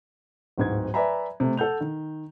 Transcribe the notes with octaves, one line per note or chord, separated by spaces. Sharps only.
D1 G#2 G#6
B4 D5 E5 G#5 A#5 B5
C3 A3
A4 F#5 G6 F7
D#3